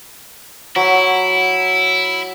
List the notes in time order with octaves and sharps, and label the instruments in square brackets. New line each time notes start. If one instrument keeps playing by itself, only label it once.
[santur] F#3 [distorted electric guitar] E4